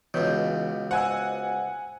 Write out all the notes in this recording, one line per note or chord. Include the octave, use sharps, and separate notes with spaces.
C#2 B2 E3 C#5 G6
C5 F#5 G#5 E6